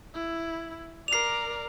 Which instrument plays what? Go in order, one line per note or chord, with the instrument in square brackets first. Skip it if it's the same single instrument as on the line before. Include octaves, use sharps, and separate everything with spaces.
[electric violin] E4
[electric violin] A#4 D5 [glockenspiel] C7 F7